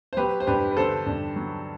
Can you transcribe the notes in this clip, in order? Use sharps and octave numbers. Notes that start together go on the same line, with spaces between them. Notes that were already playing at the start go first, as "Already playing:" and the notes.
C5
F#3 G4 B4
C5
G2 G4 B4
B4
D3 A4 C5
G2
F#3